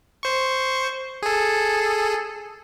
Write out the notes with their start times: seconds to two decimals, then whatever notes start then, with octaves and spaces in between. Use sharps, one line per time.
0.23 C5 C#6
1.22 G#4 A4